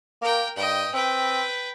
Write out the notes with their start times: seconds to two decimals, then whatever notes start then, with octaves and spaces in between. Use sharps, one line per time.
0.22 A#3 A#4 G5
0.57 G2 D#5 G5
0.94 C4 B4 G5